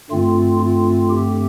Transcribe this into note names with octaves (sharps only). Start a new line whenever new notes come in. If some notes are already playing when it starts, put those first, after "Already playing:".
G2 D3 A3 C4 F4
F4
G4